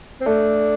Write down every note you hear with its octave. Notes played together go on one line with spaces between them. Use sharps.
C4
A3 D4